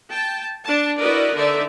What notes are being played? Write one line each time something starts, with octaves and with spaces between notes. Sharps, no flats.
G5 A5
D4 A5
E4 F#4 A#4 B4 D5 D#5
D3 D#4 D5 E5